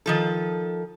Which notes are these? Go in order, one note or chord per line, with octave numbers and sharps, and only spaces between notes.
D#3 F3 A4